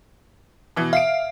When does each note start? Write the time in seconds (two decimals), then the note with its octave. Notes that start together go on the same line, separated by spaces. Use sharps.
0.76 B2 E3
0.93 E5 F5 C7 D7